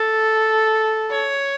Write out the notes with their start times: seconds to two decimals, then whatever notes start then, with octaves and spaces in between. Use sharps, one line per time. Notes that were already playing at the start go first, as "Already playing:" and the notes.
Already playing: A4
1.11 C#5